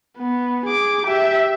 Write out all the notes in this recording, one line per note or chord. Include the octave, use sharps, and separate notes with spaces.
B3
G#4 D6
G4 E5